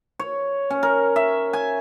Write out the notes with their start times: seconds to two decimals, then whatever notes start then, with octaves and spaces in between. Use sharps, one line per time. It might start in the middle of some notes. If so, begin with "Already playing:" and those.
0.19 C#5
0.70 C#4
0.83 A#4
1.16 E5
1.53 G#5